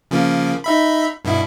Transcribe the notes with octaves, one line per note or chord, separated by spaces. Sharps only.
C#3 F3 A#3
D#4 E5 B5
G2 B2 E4